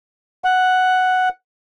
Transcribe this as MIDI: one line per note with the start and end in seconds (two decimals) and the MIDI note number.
0.44 1.29 78